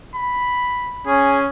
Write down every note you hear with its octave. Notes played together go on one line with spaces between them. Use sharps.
B5
C#4 G#4